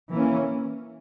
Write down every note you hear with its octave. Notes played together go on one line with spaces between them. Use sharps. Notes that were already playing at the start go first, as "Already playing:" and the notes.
E3 A#3 C#4